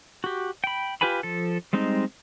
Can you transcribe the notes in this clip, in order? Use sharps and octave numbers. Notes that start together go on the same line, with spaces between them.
F#4 G4
G5 B5
F4 G4 B4 G#5 B5
F3 A4
G3 G#3 C4 D#4